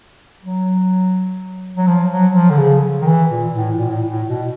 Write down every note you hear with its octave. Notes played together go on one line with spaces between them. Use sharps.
F#3
F#3
F3
F#3
F3
D3
C#3
D#3
E3
A#2
A2
A#2
A2
A2
B2